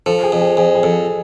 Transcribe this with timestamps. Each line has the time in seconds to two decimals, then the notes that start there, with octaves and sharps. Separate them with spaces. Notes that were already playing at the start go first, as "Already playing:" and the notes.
0.06 F3 A4
0.23 G#4
0.32 F2
0.41 G#4
0.57 F2 G#4
0.75 G#4
0.83 F2 A4